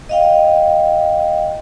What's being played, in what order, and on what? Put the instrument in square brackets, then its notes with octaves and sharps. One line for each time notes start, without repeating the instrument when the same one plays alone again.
[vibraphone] D#5 F5 G5